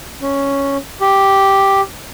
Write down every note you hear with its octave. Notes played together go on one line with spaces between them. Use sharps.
C#4
G4